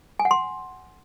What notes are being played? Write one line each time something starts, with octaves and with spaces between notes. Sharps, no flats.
G#5
F#5
C6